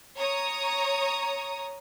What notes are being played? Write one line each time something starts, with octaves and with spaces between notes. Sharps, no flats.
C#5 A#5 D#6